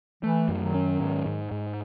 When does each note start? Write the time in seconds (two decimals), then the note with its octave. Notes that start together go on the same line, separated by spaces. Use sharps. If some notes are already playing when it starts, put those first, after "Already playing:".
0.23 E3 A3
0.49 F#2
0.62 D#3 F#3
0.74 C#4
1.00 G#2
1.26 G#2
1.52 G#2